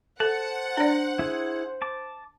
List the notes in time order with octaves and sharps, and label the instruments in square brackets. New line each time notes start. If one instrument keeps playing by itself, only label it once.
[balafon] A4 [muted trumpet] C5 [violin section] F#5 [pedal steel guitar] A5
[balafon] D4 D5
[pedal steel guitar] E4 G#4
A5 D6